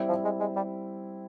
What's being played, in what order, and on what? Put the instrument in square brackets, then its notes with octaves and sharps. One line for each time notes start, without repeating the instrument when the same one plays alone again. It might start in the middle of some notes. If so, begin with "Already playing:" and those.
Already playing: [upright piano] G3 C4 E4
[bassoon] F3
G#3
G#3
G3